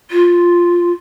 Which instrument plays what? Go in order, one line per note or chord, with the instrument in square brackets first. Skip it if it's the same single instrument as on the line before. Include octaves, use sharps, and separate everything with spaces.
[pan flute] F4